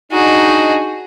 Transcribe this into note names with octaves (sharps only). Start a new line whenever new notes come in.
D4 D#4 F#4 G#4